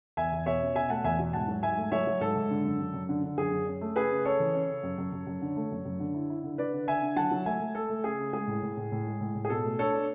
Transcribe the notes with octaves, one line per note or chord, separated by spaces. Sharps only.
E2 E5 G#5
E2
B2 C#5 E5
C#4
B2 E5 G#5
A3 F#5 A5
E2 E5 G#5
B2
G#2 F#5 A5
F#3
G#2 E5 G#5
A3
F#3 C#5 E5
F#3
G#2 A4
G#2
D3
F#2
F#2
F#2
D3
D3
F#2 G#4
F#2
C#4
A3
C#3 G#4 B4
C#3
C#4 A4 C#5
E3
C#4
C#3
F#2
F#2
F#2
F#2
D3
A3
F#2
F#2
D3
E4
E4
D3
D3 B4 D5
D3
D3 E5 G#5
D3
F#3 F#5 A5
F#3
A3 E5 G#5
A3
A3 A4
A3
C#3 G#4
C#3
G#3 G#4
A2
A2
A2
A2
G#3
A2
A2
G#4
B2 A4
A3
D4 A4 C#5
D4